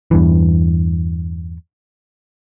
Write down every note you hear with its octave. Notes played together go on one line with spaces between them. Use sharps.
E2 G2 E3